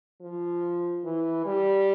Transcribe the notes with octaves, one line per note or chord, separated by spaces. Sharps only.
F3
E3
G3